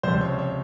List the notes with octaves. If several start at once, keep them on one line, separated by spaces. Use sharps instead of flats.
C#2 C3 F3 C5
C#5
C#5